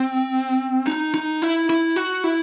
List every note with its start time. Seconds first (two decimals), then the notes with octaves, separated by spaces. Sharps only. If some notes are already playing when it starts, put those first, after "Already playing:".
Already playing: C4
0.87 D#4
1.14 D#4
1.42 E4
1.70 E4
1.96 F#4
2.24 E4